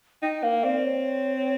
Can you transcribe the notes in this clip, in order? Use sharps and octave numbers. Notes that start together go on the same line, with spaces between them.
D#4 G5
A#3 F5
C4 D5
C#5